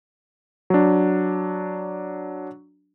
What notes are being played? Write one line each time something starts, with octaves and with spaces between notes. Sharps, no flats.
F#3 D4